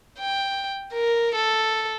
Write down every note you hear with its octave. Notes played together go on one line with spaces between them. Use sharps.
G5
A#4
A4